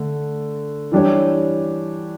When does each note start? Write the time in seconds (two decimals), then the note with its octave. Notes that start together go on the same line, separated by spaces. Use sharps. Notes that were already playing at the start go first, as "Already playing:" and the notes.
Already playing: D3 A3
0.92 E3 G3 D4 G4 C#5